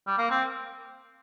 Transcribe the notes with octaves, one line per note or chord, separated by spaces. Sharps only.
G3
A#3
C4